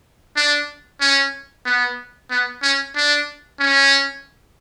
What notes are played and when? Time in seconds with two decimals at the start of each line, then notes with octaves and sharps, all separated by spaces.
0.37 D4
1.01 C#4
1.66 B3
2.30 B3
2.63 C#4
2.96 D4
3.60 C#4